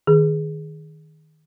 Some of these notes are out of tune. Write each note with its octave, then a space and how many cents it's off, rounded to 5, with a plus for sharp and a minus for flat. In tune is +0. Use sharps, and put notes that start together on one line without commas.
D#3 +0 G#4 +0